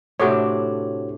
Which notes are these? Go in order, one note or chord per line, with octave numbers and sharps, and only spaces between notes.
A2 C3 D4 F#4 C#5